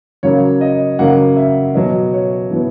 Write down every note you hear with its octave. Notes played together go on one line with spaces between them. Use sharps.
C#3 F#3 A#3 C#5
D#5
C#3 F#3 A#3 F#5
E5
B2 F#3 B3 D#5
C#5
B2 F#3 B3 E4